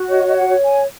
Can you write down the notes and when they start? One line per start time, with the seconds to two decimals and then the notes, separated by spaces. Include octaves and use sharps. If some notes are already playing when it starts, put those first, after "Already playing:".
Already playing: F#4
0.10 C#5 D#5
0.27 D#5
0.36 F#5
0.49 C#5
0.63 G#5